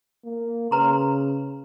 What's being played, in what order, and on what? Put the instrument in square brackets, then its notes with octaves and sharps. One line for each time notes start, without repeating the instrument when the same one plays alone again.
[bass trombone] A#3
[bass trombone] C#3 [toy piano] B4 A#5 C6